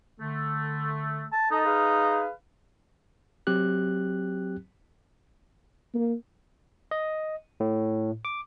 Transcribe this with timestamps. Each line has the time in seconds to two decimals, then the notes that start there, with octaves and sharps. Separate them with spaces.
0.20 D3 A3
1.32 A5
1.51 D#4 A4 D#5 A5
1.65 G#4 B4 F5
3.47 F#3 C4 G4 F#6
5.94 A#3
6.91 D#5
7.60 A2
8.25 D6